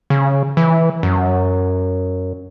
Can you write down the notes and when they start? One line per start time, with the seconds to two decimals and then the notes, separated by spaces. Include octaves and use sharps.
0.10 C#3
0.57 E3
1.03 F#2